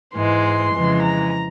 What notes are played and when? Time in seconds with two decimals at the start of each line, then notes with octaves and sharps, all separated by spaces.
0.15 G#2 E3 G#3 C6
0.74 F2 C#3 E3 G#3
1.03 A#5